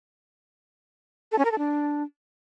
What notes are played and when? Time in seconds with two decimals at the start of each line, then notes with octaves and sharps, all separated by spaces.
1.32 A4
1.38 C#4
1.45 A#4
1.52 A4
1.58 D4